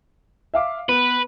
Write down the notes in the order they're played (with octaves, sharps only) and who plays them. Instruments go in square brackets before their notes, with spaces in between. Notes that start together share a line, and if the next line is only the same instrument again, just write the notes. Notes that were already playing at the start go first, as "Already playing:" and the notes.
[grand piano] E5 F5 D6
[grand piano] B3 [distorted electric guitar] B4